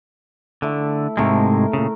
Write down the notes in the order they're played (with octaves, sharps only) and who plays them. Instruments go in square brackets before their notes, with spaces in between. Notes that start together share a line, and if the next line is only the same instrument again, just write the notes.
[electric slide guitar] D3 [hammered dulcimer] A3 E4
[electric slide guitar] G#2 C3 G#3 [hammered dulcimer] A3 A#4
[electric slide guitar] A#2 C#3